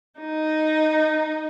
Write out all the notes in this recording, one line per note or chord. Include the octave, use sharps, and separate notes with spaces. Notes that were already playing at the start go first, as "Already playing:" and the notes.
D#4